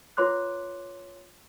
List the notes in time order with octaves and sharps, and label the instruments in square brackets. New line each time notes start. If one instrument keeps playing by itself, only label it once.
[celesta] F4 B4 C#5 C6 D6 F#6